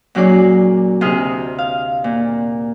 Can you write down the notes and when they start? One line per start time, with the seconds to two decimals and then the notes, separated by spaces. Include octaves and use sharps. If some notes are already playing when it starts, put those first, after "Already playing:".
0.15 A#2 F#3 C#4 G#4 D5
1.01 D2 C3 G4 G#4 D#5 F6
1.58 F5
2.04 A#2